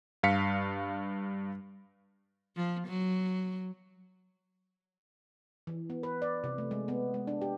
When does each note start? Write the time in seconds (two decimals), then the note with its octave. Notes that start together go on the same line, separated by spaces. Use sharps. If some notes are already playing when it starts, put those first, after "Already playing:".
0.23 G2 F5 B6 C#7
2.56 F3
2.88 F#3
5.67 E3
5.90 B3
6.03 B4
6.22 D5
6.44 C3
6.58 A3
6.71 G#3
6.88 B3
7.14 G#3
7.27 D4
7.42 G4